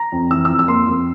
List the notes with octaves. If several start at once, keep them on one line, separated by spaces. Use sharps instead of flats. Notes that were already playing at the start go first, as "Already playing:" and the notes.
Already playing: A#5
F2
E3 E6
E6
F2
E6
A#3 C6
F2